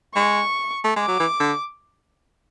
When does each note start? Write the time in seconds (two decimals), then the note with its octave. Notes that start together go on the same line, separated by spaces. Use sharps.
0.15 G#3 C#6
0.84 A3
0.96 G#3 D6
1.08 F#3
1.20 E3
1.40 D3